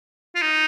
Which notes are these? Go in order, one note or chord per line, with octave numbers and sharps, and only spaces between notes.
F4
D#4